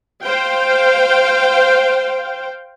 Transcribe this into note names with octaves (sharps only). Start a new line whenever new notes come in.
C5 F5 G5